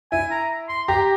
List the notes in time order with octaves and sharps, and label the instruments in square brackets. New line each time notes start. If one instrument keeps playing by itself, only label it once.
[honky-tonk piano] E4 [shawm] G#5
[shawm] A#5
C6
[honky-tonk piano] G4 [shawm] A#5